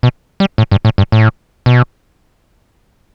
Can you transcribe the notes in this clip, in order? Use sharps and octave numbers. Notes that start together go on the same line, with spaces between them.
B2
G3
A2
G2
A2
G2
A2
B2